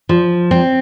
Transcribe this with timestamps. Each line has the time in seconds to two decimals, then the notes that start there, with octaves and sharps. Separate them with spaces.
0.09 F3
0.51 C4